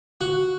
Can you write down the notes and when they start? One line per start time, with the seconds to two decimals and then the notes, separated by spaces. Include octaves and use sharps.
0.21 F#4